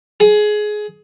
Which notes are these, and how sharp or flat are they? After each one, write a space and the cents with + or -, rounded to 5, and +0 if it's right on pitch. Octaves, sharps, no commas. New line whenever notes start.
G#4 +20